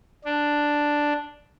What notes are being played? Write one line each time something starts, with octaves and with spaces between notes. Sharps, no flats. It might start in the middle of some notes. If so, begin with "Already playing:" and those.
D4